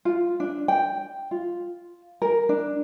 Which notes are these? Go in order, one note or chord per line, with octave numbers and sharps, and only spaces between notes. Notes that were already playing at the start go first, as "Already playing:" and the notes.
F4
D4
G5
F4
A#4
D4